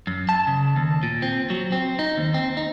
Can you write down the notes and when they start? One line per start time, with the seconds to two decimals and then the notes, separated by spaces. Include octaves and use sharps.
0.07 F#2
0.29 A5
0.47 C#3
0.76 D#2
1.03 A#2
1.22 C4
1.50 F#3
1.72 C4
1.99 D#4
2.17 D#2
2.34 C4
2.57 D#4